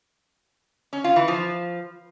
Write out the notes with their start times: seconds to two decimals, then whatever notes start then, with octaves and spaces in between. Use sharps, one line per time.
0.93 C#4
1.04 F4
1.16 E3
1.28 F3